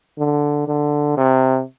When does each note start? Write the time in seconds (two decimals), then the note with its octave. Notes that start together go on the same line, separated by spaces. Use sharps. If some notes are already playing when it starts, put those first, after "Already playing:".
0.18 D3
0.67 D3
1.17 C3